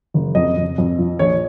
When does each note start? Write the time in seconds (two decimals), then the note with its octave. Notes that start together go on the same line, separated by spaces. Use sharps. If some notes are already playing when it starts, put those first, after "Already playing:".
0.14 F#1
0.35 F2 D#5
0.57 F2
0.78 F2
0.99 F3
1.19 A#1 C#5